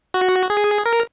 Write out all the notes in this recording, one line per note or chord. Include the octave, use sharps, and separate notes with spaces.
F#4
G#4
A#4